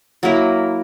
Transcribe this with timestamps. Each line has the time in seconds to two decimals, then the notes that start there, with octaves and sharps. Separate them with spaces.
0.23 F#3 A#3 E4 A#4